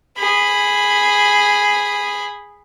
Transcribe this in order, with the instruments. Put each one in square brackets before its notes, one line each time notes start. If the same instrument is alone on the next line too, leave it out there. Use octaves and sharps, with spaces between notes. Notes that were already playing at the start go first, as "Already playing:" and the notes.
[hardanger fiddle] G#4 B5